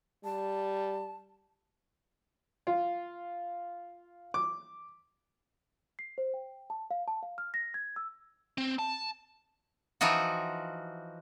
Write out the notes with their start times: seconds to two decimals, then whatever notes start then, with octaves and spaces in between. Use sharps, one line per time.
0.24 G3 A5
2.67 F4
4.34 D6
5.99 C7
6.18 C5
6.34 G5
6.70 A5
6.91 F5
7.08 A5
7.23 F5
7.38 F6
7.54 A#6
7.74 G#6
7.96 E6
8.58 C4
8.79 A5
10.01 E3 F3 D#4 F4 F#4